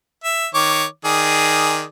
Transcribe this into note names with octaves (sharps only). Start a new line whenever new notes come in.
E5
D#3 C#5 D6
D#3 G#4 D5